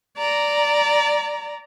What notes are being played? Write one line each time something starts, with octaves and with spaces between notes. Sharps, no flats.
D5 A#5